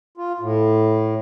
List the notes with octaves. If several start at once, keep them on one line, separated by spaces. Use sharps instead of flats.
F4
A2